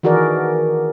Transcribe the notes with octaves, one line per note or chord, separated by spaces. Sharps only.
D#3 E3 F#4 G#4 A#4 D5